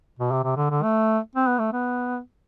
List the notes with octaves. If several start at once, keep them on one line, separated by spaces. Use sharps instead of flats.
B2
C3
C3
D3
D3
A3
C4
B3
A3
B3